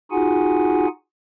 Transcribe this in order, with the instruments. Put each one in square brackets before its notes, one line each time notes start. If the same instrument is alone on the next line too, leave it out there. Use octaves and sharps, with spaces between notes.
[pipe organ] D#4 F4 F#4 G#4 F#5 G#5